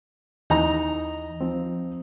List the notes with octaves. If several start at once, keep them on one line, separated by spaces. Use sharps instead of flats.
D#2 E3 D#4 A#5
F3 C4